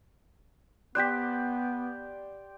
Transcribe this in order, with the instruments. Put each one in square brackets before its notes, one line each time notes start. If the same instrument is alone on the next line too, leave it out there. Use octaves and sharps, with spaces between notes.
[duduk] B3 [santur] G4 C5 D5 [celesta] F#6 B6